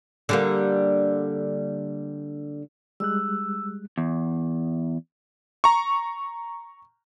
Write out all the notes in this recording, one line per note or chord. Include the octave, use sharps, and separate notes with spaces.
D3 G3 A#3
G3 G#3 E6 F#6
E2
A#5 C#6